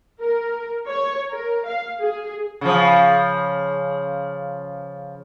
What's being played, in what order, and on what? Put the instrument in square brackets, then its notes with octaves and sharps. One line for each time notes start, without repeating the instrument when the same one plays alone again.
[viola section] A#4
C#5
A#4
F5
G#4
[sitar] C#3 F3